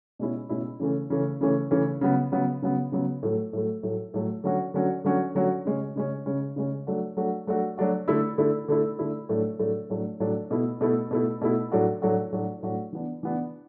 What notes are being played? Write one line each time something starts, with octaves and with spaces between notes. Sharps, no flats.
B2 G#3 C#4 E4
B2 G#3 C#4 E4
C#3 E3 A3 C#4
C#3 E3 A3 C#4
C#3 E3 A3 C#4
C#3 E3 A3 C#4
C#3 F#3 B3
C#3 F#3 B3
C#3 F#3 B3
C#3 F#3 B3
A2 F#3 A3
A2 F#3 A3
A2 F#3 A3
A2 F#3 A3
D3 F#3 C#4 F#4
D3 F#3 C#4 F#4
D3 F#3 C#4 F#4
D3 F#3 C#4 F#4
C#3 G#3 C#4
C#3 G#3 C#4
C#3 G#3 C#4
C#3 G#3 C#4
F#3 A3 D4 F#4
F#3 A3 D4 F#4
F#3 A3 D4 F#4
F#3 A3 D4 F#4
D3 A3 E4
D3 A3 E4
D3 A3 E4
D3 A3 E4
A2 F#3 A3 D4
A2 F#3 A3 D4
A2 F#3 A3 D4
A2 F#3 A3 D4
B2 A3 E4
B2 A3 E4
B2 A3 E4
B2 A3 E4
A2 F#3 A3 D4 F#4
A2 F#3 A3 D4 F#4
A2 F#3 A3 D4 F#4
A2 F#3 A3 D4 F#4
E3 B3 D4
E3 B3 D4